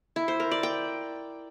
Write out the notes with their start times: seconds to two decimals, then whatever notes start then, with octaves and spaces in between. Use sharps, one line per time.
0.16 E4
0.28 C5
0.40 A#4
0.51 D5
0.63 G5